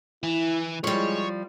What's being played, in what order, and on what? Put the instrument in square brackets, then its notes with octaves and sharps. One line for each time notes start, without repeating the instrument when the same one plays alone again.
[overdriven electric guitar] E3 [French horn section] E4
[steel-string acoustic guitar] F3 G3 [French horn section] G#3 [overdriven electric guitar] C#5